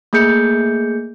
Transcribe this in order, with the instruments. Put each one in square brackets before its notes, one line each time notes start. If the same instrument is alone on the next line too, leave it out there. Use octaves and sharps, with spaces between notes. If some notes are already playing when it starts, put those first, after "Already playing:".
[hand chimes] A3 A#3 G#4 G6 C#7